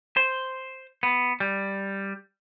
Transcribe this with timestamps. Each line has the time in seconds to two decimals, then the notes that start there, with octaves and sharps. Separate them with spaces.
0.17 C5
1.03 B3
1.40 G3